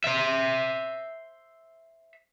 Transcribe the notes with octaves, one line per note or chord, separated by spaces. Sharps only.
C5 E5